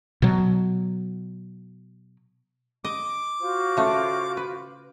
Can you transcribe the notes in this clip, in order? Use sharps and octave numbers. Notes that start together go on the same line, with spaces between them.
B2 F#3
D#5 D6
F4 F#4 C5
C#3 A3
B4